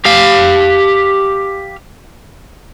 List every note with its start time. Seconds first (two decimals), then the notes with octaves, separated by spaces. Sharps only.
0.05 G4 F5